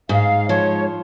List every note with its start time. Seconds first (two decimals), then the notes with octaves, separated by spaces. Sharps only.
0.09 G#2 F5
0.49 F3 C#5